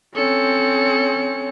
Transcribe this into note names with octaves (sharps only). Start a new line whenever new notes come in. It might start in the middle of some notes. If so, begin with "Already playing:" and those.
C4 C#4 A4 C#7